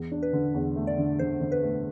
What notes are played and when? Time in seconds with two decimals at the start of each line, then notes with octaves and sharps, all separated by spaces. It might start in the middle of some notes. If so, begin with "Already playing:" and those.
Already playing: E2
0.11 D4
0.23 B4
0.33 D3
0.54 E2
0.76 A3
0.87 D5
0.97 D3
1.19 D3 C5
1.41 D3
1.52 B4
1.62 A3